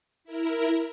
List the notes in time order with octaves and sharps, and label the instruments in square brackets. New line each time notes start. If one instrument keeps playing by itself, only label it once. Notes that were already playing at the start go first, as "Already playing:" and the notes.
[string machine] E4 A#4